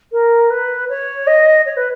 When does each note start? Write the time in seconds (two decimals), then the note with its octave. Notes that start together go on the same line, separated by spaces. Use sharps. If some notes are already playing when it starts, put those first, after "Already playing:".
0.12 A#4
0.50 B4
0.89 C#5
1.27 D#5
1.66 C#5
1.77 B4